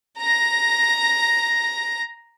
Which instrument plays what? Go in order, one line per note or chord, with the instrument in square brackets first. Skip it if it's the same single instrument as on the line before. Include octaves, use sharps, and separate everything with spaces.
[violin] A#5 A#6